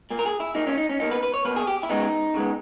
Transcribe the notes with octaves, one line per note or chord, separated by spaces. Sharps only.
A#2 A#3
A#4
G#4
E4
A#2 A#3 D#4
C#4
D#4
C#4
B2 A#3 D#4
B4
B4
C#5
B2 A#3 B4
G#4
G4
E4
C#3 G#3 B3 D#4
C#3 G#3 B3